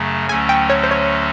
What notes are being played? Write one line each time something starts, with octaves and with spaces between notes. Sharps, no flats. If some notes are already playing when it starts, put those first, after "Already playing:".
Already playing: F#2 C#3 F#3 A3
D2 D3 F#3 A3 C#4 G#5
G5
C#5
C5
C#5